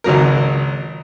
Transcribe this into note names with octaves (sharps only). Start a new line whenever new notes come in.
G#1 C#2 F#3 A#4